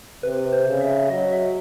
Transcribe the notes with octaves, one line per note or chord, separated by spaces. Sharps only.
C3 B4
C5
C#3
E5
F#3 D#5
E5